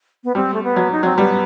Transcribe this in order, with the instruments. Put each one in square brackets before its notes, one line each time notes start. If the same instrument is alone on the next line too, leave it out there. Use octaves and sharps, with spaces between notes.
[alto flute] B3
[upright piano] G3 [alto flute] C4
[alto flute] A3
B3
[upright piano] F#3
[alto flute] D#4
[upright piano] F#3 [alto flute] C4
[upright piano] G3 [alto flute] B3